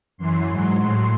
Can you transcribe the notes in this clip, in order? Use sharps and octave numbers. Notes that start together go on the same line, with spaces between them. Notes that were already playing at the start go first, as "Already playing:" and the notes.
F#2 E3 C6
G#2 F#3
A2 F#3